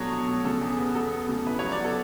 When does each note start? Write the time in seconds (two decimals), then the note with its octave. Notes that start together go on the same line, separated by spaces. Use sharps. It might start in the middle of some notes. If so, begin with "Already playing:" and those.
Already playing: B2 F#3 D4 A4 C#5
0.11 B2
0.28 B2
0.45 C#3 A4
0.61 E2
0.79 B3
0.95 E2 A4
1.13 B3
1.29 C#3
1.46 E4 B4
1.59 F#3 C#5
1.72 D5
1.81 B3 A4